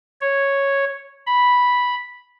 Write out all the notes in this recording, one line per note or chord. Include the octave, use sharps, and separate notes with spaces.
C#5
B5